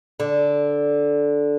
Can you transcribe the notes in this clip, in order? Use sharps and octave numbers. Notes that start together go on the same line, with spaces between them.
D3